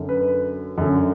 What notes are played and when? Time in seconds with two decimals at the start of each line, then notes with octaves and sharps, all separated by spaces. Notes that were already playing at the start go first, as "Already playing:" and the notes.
Already playing: F#2 D3
0.09 B4
0.78 F#2 D3